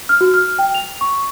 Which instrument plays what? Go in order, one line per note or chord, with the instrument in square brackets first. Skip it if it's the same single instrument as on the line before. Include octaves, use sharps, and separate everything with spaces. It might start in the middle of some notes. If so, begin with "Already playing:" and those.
[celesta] F6
F#4
F6
G5
F7
C#6